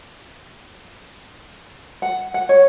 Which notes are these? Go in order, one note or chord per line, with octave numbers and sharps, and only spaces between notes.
F#5
F#5
C#5